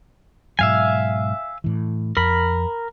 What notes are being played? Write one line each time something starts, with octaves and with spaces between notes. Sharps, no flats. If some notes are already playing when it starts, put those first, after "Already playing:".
G#2 B2 F#3 E5 F5 G#5
A2 E3
F2 A#4 B5